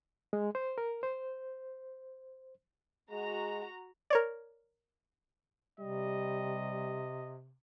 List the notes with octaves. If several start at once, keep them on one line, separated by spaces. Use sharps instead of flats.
G#3
C5
A#4
C5
G#3 F#4 A#5
A#4 C#5 D5
C3 G3 D#5